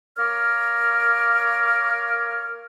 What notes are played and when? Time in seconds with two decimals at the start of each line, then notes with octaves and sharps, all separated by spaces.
0.17 A#3 A#4 C#5 D6 F6